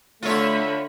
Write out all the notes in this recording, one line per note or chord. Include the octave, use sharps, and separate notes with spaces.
D3 A3 F4 C#5 E5 B5